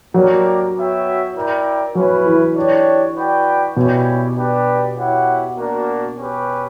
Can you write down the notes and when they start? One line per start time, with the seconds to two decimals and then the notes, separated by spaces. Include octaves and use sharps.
0.14 F#3 A#3 D4 G4 A#4
0.75 B3 F#4 C#5 E5 G5
1.35 E4 A#4 D5 G5
1.95 F#3 C#4 E4 B4
2.26 E3
2.56 D4 G4 C#5
3.16 F#4 B4 D5 G5
3.77 B2 G3 C#4 E4 G4 C#5
4.36 D4 G4 B4
4.97 E4 G4 C#5 F#5
5.57 A#3 D4 F#4 A#4
6.18 C#4 G4 B4